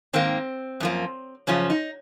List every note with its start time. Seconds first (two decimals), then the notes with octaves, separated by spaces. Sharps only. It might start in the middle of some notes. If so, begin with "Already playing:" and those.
0.13 G#2 D#3 A#3 C4
0.80 F#2 F3 A#3
1.47 F#2 C#3 F3 C#4
1.70 D#4